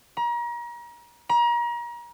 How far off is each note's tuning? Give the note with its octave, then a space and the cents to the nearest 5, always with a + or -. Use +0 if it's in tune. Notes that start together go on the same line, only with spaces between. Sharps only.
A#5 +35
A#5 +35